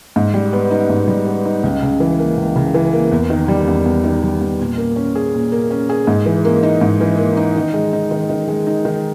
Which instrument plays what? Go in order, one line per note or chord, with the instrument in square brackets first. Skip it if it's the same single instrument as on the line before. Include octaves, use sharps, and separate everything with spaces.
[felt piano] G#2
G3
B3
D#4
G#2
G3
B3
D#4
C#2
C#3
E3
A#3
C#2
C#3
E3
A#3
E2
D#3
G3
E2
E2
D#3
G3
E2
A#2
A#3
C#4
G#4
A#2
A#3
C#4
G#4
G#2
E3
A#3
D#4
G#2
E3
A#3
D#4
D#3
G#3
D#4
D#3
D#3
G#3
D#4
D#3